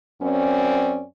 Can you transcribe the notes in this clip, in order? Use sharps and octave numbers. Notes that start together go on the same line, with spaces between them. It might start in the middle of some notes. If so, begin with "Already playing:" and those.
F#2 C4 C#4 D5